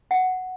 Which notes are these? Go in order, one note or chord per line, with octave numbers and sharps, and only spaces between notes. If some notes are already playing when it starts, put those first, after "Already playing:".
F#5